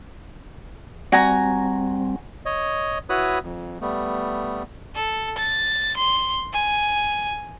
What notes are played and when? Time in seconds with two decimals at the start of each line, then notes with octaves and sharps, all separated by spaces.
1.12 G3 C4 F#4 G#5 A#5
2.46 C#5 D#5
3.09 E4 F#4 B4 C#5 B5 D#6
3.43 F2
3.81 G3 A3 B3
4.95 A4
5.38 A6
5.97 C6
6.53 G#5